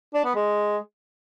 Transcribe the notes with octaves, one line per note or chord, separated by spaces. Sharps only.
D4
B3
G#3